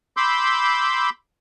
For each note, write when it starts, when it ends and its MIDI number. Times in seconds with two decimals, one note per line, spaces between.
0.17 1.10 83
0.17 1.10 84
0.17 1.10 86
0.17 1.10 88
0.17 1.10 91